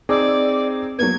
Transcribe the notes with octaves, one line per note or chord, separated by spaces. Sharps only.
C4 D#4 G#4 D5 D6 E6
F#3 A#3 B3 G#6